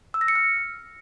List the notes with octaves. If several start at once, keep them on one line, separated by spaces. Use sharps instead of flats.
E6
A#6
C#7
F6